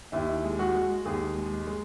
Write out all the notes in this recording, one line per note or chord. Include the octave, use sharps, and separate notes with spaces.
D#2 E4
G#3
F#4
G#3
D#2 G#4
G#3
G#3